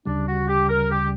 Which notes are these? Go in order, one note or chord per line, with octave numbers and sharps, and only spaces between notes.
D2 C#3 G3 D4
F#4
G4
A#4
G4